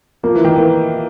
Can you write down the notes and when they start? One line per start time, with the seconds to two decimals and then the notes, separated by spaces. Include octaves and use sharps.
0.23 F3 A#3
0.35 E3
0.44 D#3
0.56 E3 A#3